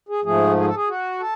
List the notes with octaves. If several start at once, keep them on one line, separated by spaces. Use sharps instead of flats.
G#4
G#2 F3 A3 G#4
G#4
A4
G#4
F#4
A4